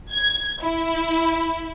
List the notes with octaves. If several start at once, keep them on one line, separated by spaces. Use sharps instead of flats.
G#6
E4